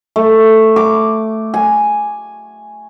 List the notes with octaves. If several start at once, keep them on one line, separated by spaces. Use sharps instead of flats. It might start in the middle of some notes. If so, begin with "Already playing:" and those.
A3
D6
G#5